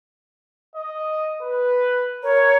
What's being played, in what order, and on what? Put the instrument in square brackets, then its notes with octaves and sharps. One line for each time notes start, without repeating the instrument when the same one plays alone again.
[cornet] D#5
B4
[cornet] A#4 [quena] C#5